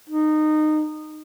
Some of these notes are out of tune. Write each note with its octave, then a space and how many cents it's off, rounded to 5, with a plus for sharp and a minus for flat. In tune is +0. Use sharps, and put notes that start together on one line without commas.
D#4 -20